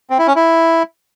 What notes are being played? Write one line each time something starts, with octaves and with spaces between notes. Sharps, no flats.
C4
E4
C#4
E4